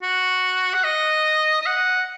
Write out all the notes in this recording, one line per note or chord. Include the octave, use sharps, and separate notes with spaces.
F#4
F#5
D#5
D#5
F#5